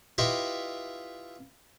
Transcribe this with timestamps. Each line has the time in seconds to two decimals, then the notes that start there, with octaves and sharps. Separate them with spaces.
0.18 E4 F4 G4 B4 D#5 E5